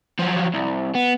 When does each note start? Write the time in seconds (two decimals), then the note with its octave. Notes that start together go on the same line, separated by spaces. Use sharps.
0.19 F3 F#3
0.54 C2
0.95 B3